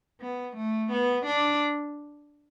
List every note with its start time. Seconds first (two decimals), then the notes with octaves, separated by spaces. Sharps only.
0.20 B3
0.57 A3
0.92 B3
1.26 D4